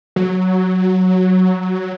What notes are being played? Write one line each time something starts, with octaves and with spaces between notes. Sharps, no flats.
F#3